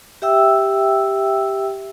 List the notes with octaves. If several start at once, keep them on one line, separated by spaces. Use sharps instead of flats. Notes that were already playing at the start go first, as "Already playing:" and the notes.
G4 E5 G5 E6